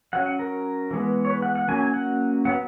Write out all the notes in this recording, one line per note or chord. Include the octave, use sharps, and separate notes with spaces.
F#3 C#4 F#5
F#5
A#4
E3 G#3 B3
C#5
B4
F#5
F#5
F#3 A#3 C#4 G#5
G#5
F#5
F#3 B3 F#5